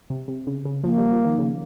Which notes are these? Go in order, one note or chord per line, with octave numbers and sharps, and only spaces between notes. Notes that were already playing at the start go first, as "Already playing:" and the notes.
C3
C3
C#3
C#3
F3 A#3
G3
F3
D#3
C#3